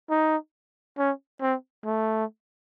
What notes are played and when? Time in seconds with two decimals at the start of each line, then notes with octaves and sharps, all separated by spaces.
0.10 D#4
0.98 C#4
1.41 C4
1.85 A3